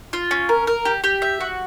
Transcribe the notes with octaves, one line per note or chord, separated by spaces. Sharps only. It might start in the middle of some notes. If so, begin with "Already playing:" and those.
F4
C#4
A#4
A#4
G4
G4
E5
F#4